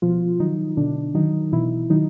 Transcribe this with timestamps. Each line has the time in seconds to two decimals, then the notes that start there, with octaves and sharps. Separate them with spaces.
0.02 B2 F3 F4
0.40 D#3 F#3 D#4
0.77 B2 D3 D4
1.14 D#3 F#3 D#4
1.52 B2 E3 E4
1.90 D#3 F#3 D#4